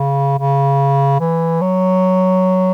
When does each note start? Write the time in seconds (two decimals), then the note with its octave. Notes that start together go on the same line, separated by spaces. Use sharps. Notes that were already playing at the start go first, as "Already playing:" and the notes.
Already playing: C#3
0.38 C#3
1.20 E3
1.61 F#3